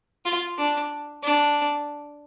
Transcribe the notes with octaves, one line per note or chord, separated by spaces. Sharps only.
F4
D4
D4